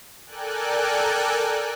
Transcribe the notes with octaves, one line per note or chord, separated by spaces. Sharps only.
A4 A#4 D5 G5 G#5 F#6